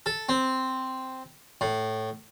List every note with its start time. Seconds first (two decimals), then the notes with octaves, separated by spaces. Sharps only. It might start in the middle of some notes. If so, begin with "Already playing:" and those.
0.06 A4
0.29 C4
1.61 A2